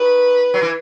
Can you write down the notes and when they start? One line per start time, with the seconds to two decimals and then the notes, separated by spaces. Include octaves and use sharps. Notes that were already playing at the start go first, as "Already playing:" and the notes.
Already playing: D#3 B4
0.54 F#3
0.62 E3